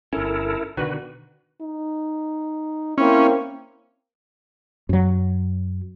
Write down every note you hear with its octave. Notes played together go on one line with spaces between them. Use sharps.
G1 C#4 E4 A4 A#4
B2 D3 D#3 F#4 B4
D#4
A#3 C4 C#4 E4
F#2 F#3